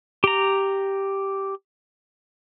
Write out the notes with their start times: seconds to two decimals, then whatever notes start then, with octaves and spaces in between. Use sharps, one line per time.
0.24 G4 A#5